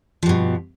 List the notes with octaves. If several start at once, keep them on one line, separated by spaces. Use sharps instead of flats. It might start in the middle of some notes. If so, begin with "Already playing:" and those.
G2 B2 F3